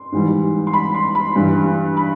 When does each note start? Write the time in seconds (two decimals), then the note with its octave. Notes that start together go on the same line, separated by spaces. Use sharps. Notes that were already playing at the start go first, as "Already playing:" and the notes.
Already playing: C6
0.12 G#2 E3 G3
0.67 C6
0.73 B5
0.94 C6
1.15 B5
1.35 G2 E3 G3
1.97 B5